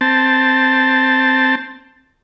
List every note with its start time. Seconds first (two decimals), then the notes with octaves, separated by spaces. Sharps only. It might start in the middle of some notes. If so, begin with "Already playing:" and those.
0.01 C4 A5